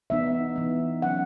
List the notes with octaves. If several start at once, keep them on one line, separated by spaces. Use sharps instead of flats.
E3 B3 D#4 E5
E3 B3 D#4
F#3 C#4 F#5